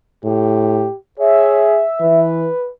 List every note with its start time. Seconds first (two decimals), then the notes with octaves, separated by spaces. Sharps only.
0.25 A2 G4
1.20 G#4 C#5 E5
2.01 E3 B4